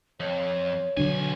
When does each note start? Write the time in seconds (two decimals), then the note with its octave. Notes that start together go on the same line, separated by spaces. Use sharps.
0.20 F2 C#5
0.97 B1 D3 F#3 D4 G#5